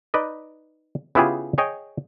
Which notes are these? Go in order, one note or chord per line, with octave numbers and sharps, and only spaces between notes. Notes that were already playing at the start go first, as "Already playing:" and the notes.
D#4 B4 D5 D#5
C#3 B3 E4 F4 G4 G#4
G#4 C#5 D#5 G5